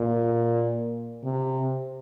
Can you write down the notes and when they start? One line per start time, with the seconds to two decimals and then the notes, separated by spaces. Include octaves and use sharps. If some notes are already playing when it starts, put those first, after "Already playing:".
Already playing: A#2
1.24 C3